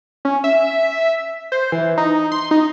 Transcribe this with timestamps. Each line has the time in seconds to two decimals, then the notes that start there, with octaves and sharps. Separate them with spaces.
0.25 C#4
0.44 E5
1.52 C5
1.72 E3
1.98 D#4
2.32 C6
2.51 D#4